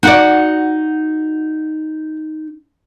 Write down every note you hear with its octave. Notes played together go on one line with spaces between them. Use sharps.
D#4 F#4 D5 F#5